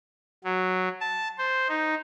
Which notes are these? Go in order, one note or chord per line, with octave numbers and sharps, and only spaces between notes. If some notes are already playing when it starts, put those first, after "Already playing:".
F#3
A5
C5
D#4